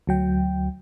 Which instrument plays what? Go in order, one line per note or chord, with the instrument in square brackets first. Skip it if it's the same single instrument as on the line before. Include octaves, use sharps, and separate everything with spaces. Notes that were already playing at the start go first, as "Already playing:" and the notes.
[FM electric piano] D2 F#3 G5